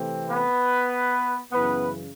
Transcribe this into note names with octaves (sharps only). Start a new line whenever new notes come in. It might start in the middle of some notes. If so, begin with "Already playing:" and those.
Already playing: C3 E3 A3 C4
B3 B4
F#2 C#3 E3 B3 B4